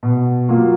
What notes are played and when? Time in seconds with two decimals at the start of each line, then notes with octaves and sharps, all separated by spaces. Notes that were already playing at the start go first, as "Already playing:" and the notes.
0.03 B2
0.49 F#3 A#3 F4